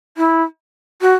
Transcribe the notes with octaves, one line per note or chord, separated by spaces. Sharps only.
E4
F#4